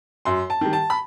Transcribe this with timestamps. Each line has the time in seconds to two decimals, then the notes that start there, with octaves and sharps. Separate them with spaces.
0.25 F#2 C6
0.50 A5
0.61 D#3 G3
0.73 A5
0.90 B5